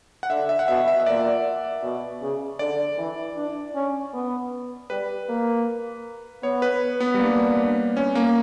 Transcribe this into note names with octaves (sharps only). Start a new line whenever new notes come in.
F#5
D3 E5
E5
F#5
B2 E5
E5
E5
A#2 D5
B2
C#3
D3 D5
E3
D4
C#4
B3
G3 B4
A#3
B3 C#5
B4
B3
G3
A#3 D4
C#4
A#3